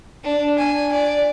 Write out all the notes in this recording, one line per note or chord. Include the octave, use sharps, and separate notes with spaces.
D4
G#5
D5